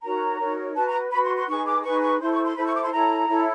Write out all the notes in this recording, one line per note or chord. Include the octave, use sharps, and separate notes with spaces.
D#4 F#4 A#4 C#5 A#5
D#4 F#4 A#4 C#5
F#4 B4 A5
A#5
F#4 B4 B5
C6
C6
D#4 G#4 B4 C#6
D6
D#4 G#4 B4 C#6
C#6
E4 A4 C5 C6
C#6
C6
E4 A4 C5 B5
C#6
D6
C6
E4 A4 C#5 A#5
E4 A4 C#5